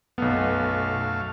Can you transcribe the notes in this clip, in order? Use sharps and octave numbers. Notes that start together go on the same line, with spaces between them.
B1 F#2 A3 B3 F5